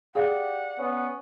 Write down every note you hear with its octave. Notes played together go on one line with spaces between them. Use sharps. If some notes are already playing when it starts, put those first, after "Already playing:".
G4 G#4 D5 F5 F#5
B3 C#4